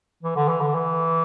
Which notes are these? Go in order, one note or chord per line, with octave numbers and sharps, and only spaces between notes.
E3
D3
E3
D3
E3